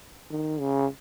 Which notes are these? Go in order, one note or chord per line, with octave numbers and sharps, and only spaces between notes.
D#3
C#3